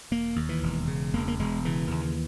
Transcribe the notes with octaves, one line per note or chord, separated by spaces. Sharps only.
E1 A#3
D#2
E3
E1
C#3
E1 A#3
A#3
E1 G#3
C#3 E3
D#2